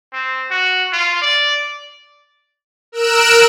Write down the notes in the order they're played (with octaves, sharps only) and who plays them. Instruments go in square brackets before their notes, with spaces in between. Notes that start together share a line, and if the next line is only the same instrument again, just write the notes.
[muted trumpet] C4
F#4
F4
D5
[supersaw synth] A#4 E6 F#6 D7 E7